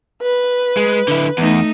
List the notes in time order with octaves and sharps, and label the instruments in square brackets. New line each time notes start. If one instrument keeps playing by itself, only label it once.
[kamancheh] B4
[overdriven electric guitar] G#3
D3 E4
[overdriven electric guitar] E2 [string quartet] A3 D#4